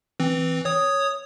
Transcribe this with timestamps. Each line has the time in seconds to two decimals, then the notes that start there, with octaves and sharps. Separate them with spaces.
0.20 E3 C4
0.65 C#5 D#6